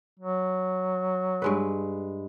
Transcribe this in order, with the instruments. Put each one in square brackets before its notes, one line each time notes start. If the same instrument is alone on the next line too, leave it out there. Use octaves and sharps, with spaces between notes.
[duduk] F#3
[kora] G2 G#3 B4